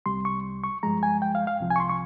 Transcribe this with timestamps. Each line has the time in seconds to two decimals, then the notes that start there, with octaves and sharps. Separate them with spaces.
0.06 C2 C3 G3 C6
0.25 C#6
0.64 C#6
0.83 G2 F3 G#3 A#5
1.03 G#5
1.22 G5
1.35 F5
1.47 F5
1.60 C2 C3 F3
1.70 G#5
1.76 C#6
1.80 C6
1.90 C#6